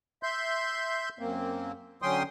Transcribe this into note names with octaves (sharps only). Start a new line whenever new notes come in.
E5 C6 G6
F#2 A#3 C4
D3 F#3 C#4 G5 C6 D#6